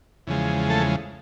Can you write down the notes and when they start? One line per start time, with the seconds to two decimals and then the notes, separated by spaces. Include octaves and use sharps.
0.27 E2 C#3 F3 G#3
0.70 A3 A4